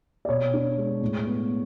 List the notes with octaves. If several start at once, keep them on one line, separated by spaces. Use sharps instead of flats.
D5
B2 C#5
D4
G#3
A2
B3